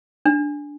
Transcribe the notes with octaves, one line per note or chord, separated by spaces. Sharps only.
D4